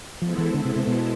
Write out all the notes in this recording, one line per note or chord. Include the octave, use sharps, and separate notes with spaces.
F3 G#3 B3 E4 A4 C5
E3
D3
C3
C3
B2